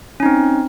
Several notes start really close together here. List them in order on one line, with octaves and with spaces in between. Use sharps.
C#4 D#4 C4